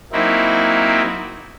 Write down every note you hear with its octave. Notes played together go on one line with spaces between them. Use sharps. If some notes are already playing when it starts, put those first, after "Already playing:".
F#3 A#3 C4 D#4 E4